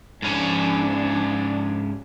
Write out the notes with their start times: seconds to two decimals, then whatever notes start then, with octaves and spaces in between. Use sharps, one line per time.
0.22 G#2 F3 C#4 D4